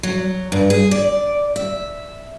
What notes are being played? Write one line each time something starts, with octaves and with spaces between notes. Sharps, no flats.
F#3
G2
G#4
D5
E5